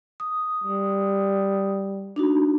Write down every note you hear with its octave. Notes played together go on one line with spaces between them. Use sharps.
D#6
G3
D4 D#4 F#4